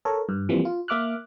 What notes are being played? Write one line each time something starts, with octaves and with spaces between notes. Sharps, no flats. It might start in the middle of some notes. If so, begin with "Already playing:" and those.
A4 A#4 C#5
G2
E3 F3 G3 A#3 C4
F4
A#3 E5 D6 F6 F#6